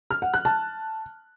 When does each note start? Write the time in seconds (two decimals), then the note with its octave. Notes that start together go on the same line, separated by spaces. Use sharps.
0.11 F6
0.22 F#5
0.34 F#6
0.45 A5